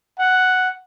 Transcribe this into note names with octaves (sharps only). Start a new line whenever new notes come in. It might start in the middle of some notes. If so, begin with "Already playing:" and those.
F#5